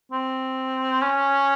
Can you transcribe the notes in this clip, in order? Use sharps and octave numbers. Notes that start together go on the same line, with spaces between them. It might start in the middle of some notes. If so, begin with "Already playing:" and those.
C4
C#4